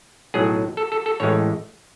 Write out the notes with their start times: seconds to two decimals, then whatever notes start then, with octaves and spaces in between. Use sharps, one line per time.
0.34 B1 A2 F#3 G#4
0.77 A4
0.92 A4
1.06 A4
1.20 A1 A2 E3 G#3 C#5